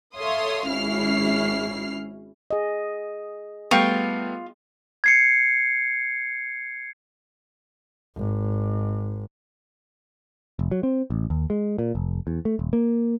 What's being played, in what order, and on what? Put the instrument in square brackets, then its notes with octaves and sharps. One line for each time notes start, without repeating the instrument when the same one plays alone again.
[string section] A4 C#5 E5 F5 C6 D#6
G#1 C#4 E4 F6 C7
[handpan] G#4 D#5
[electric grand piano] G3 A3 B3 [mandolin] F4 [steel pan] G5 C#6
[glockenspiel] G#6 C7 C#7
[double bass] G#1
[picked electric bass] F1
F#3
C4
A1
D#2
G#3
A#2
F1
E2
A3
D#1
A#3